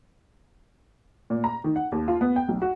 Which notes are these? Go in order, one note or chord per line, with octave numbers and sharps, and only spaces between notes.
A#2
A#5
D#3
F#5
D#2
F4
B3
G5
B1
F#4